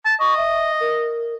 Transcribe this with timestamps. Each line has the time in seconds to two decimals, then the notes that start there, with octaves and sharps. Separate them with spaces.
0.05 A5
0.20 D#5 C#6
0.37 E5
0.80 A#4